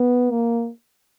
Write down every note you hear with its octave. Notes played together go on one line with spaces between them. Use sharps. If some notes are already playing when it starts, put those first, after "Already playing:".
Already playing: B3
A#3